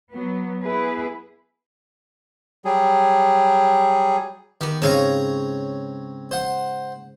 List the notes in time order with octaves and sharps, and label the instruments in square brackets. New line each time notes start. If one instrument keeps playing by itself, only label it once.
[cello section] F#3 B3
B3 E4 G#4 B4
[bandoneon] F#3 G3 G#4
[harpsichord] D#3 [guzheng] B3 G4
[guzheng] G#2 C#3 F5 [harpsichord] C4 C#5 A#5
[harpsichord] C5 F#5